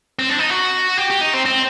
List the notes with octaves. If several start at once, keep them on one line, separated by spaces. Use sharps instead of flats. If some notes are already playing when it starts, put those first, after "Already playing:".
C4
D4
D#4
F#4
G4
G4
D#4
C4
C4